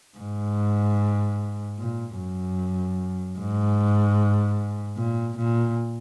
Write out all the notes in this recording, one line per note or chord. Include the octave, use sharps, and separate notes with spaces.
G#2
A#2
F#2
G#2
A#2
A#2